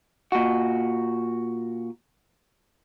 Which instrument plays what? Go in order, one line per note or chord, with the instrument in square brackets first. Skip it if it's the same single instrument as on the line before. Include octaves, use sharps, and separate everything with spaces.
[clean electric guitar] A#2 F#4